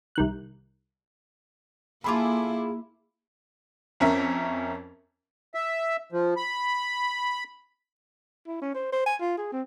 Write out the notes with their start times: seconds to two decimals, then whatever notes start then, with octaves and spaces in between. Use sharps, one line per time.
0.15 C2 D#3 F#6
2.04 A#3 E4 F4 G#4 A4 B5 C6 D6
4.00 F2 C#4 A#4 E5
5.55 E5
6.12 F3
6.37 B5
8.47 E4
8.62 C#4
8.75 C5
8.92 C5
9.06 G#5
9.21 F4
9.38 G#4
9.53 C4